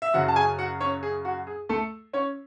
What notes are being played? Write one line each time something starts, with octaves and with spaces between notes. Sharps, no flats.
E5
F#2 C#3 F#3 C#4 F#4 F#5
A5
G#4 G#5
F#4 F#5
C#4 C#5
G#4
F#4
G#4
A3 A4
C#4 C#5